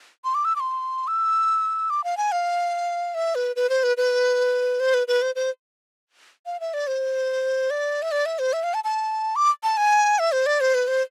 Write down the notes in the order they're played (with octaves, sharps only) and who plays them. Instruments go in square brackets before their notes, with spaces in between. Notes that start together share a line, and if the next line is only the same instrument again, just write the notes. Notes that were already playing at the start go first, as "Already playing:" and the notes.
[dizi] C6
D6
E6
D6
C6
E6
D6
F5
G#5
F5
E5
B4
B4
C5
B4
B4
C5
B4
B4
C5
C5
F5
E5
D5
C5
D5
E5
D5
E5
C5
E5
F5
A5
A5
D6
A5
G#5
E5
C5
D5
C5
B4
C5